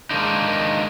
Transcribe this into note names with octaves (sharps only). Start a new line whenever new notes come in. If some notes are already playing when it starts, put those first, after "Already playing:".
D#3 G#3 A#3 D4 D#4